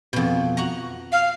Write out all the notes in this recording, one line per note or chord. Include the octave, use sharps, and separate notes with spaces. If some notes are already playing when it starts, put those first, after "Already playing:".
F2 B2
F#4 F#5 A#5
F5